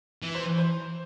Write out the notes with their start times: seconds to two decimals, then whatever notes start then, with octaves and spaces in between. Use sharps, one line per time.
0.23 E3
0.35 C5
0.58 C5